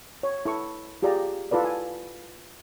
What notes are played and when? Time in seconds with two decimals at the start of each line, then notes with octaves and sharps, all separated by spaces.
0.23 C#5
0.45 E4 A4 C#6
1.02 F4 G4 G#4 D5 A#5
1.51 E4 F4 A4 B4 D5
1.64 G#5